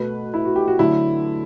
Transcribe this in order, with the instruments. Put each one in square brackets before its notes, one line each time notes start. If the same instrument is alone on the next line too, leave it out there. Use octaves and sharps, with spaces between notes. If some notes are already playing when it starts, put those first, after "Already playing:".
Already playing: [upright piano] B2 A3 B4
E4
F#4
G4
F#4
D3 F#3 A3 E4